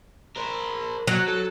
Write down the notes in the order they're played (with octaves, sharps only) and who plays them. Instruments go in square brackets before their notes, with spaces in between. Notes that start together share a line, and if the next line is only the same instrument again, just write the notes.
[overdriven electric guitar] A#4 C5
[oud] F#3
[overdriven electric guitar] A4